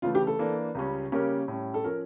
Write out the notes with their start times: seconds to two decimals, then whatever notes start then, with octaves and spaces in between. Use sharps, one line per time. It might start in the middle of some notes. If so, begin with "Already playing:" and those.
0.02 C#3 E3 A3 F4
0.15 G4
0.27 A4
0.39 E3 A#3 D4
0.75 C#2 C#3 G3 C#4
1.12 C#3 G3 A#3 C#4 G4 A#4
1.48 A2 G3 C#4
1.74 A4
1.84 F3 C#4 A#4